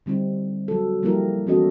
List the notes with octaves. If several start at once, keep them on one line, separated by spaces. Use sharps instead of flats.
D3 G3 C4 D#4
F#3 A4
F3 G3 A#3 E4 G4 A#4
E3 B3 C#4 F#4 A4 D#5